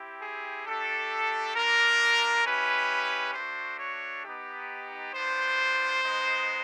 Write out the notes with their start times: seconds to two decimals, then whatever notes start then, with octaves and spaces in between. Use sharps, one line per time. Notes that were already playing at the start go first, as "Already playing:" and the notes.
Already playing: C4 E4 G4
0.21 G#4
0.66 A3 D4 G4 A4
1.55 A#3 D4 F4 A#4
2.44 G#3 C#4 E4 G4 B4
3.34 A3 D4 F#4 C5
3.78 C#5
4.24 B3 D#4 G4
5.12 B3 D4 F4 C5
6.02 G#3 B3 D#4